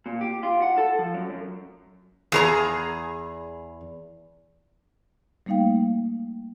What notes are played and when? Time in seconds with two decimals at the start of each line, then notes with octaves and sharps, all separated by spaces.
0.06 A#2
0.21 G4
0.43 F4
0.62 F#5
0.78 A4
0.99 F3
1.14 F#2
1.30 F#2
2.32 E2 G#4 A#5
5.46 G3 A3 A#3 D#4 F5 G5